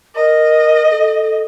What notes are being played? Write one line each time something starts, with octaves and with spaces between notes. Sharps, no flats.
A#4 D#5
A4